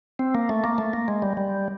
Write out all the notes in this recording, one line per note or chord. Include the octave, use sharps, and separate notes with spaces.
C4
A#3
A3
A#3
A3
A#3
G#3
G3
G3